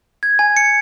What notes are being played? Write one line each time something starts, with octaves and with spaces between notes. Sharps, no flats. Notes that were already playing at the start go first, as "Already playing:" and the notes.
G#6
G#5
C#7